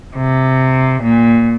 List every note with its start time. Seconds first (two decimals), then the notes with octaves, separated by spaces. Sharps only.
0.15 C3
1.01 A#2